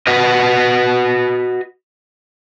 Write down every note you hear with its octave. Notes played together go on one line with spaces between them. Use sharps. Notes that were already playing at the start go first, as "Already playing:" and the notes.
F#4 B4 D#5